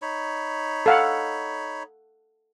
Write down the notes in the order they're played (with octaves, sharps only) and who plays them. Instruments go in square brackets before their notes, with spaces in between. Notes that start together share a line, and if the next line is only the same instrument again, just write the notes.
[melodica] D#4 C#5 B5
[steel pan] A4 F5 F#5